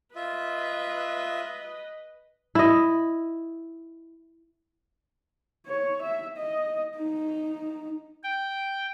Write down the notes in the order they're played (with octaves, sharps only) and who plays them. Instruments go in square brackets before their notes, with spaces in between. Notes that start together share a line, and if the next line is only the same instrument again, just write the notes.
[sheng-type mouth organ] F4 E5 [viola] B4 D#5
[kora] E4 D#5
[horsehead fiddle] C#5
E5
D#5
D#4
[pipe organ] G5